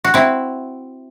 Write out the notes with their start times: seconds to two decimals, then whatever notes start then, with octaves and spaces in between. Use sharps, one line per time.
0.04 F#4
0.14 C4 E4